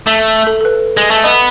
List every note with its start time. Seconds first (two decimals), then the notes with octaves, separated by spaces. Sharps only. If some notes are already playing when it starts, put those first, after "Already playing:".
0.07 A3 E5
0.47 A4
0.61 A4
0.65 B4
0.97 G#3
1.11 A3
1.24 B3 D#5